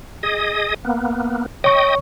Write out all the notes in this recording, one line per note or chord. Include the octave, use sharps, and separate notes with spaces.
G#4 D#5 D#6
A#3 B3
C#5 D#5 G5 C#6 D#6